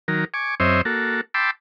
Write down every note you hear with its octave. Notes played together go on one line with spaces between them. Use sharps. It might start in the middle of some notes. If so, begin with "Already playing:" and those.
D#3 F#3 A#4
G#5 C#6 D6
F#2 C4 C5 C#5 D#5 E5
A#3 F#4 A4
G5 A5 B5 C6 D6 E6